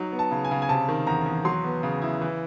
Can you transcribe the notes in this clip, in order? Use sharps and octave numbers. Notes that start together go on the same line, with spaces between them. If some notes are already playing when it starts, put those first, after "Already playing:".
Already playing: F#3 D#4
B3
A5
C#3
G#5
C#3
G#5
C3 A5
D#3
E2 A#5
E2
F#3 C6
B3
C#3
E4
E3